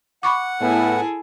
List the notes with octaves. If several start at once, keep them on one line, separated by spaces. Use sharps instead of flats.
F#5 B5 C#6 D6
A2 B3 E4 G#4 A4